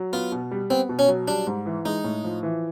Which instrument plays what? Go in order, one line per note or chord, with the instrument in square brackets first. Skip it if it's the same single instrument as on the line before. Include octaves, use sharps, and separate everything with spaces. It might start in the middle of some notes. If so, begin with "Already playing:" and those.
Already playing: [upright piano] F#3
[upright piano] B3 [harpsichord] F4
[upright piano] B2
G3
[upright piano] B3 [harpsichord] C4
[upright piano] B2
[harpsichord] C#4
[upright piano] F#3
[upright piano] G3 [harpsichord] D4
[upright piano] G#2
E3
[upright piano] G#3 [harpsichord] D#4
[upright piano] A2
F3
E3